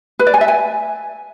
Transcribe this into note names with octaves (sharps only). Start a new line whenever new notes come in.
B4
D5
G#5
E5
G#5